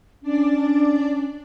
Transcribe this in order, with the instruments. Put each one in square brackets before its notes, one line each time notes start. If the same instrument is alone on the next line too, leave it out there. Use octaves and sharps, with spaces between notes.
[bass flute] C#4 [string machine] D4 D5